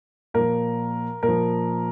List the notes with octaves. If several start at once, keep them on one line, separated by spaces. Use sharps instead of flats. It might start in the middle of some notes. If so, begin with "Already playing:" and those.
A#2 F3 A#4
A#2 A#4
F3